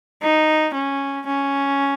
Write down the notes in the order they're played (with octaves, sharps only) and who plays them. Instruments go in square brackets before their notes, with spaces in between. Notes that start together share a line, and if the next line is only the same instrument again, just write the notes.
[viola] D#4
C#4
C#4